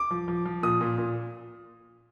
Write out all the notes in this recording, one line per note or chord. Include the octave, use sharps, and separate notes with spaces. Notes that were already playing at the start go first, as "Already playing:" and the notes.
Already playing: D6
F3
F3
F3
A#2 D#6
A#2
A#2